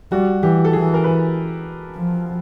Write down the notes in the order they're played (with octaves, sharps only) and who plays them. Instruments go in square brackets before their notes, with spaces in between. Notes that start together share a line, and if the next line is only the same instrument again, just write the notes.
[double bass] G3 [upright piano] F#4
[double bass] E3 [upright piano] G4
[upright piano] A4
[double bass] E3 [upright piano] G#4
[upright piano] A#4
B4
[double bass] F3